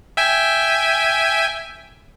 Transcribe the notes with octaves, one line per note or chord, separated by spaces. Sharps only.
E5 G5 G#5